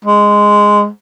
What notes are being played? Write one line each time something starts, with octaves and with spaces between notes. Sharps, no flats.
G#3